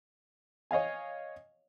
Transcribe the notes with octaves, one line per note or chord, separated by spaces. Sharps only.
C#5 D#5 F5 G#5